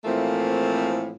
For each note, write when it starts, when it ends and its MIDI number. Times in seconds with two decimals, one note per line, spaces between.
0.05 1.16 45
0.05 1.16 52
0.05 1.16 53
0.05 1.16 57
0.05 1.16 58
0.05 1.16 60